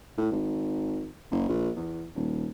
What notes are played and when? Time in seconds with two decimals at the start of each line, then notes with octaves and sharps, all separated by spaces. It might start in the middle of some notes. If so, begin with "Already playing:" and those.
0.18 A2
0.31 G#1
1.31 F#1
1.48 A#1
1.76 E2
2.15 D#1